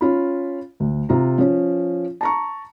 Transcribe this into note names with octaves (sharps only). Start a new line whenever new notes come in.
C#4 F4 B5
D2
C3 F4 A#5
F3 C#4
A5 A#5 C#6